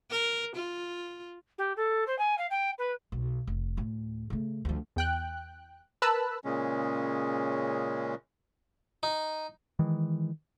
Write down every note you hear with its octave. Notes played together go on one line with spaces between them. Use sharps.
A#4
F4
G4
A4
C5
G#5
F5
G5
B4
B1
F1
D2 A2
C#3 A3
D2 F3
E2 G5 F#6
A#4 B4 A5 B5 E6 F#6
A#2 C#3 G#3 C#4
D#4
D#3 E3 G#3